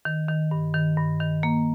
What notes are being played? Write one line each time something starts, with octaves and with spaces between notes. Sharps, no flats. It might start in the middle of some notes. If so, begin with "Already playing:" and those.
D#3
D#3
G2
D#3
G2
D#3
A#3